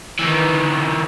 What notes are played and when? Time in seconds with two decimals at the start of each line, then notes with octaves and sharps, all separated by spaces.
0.19 D#3 E3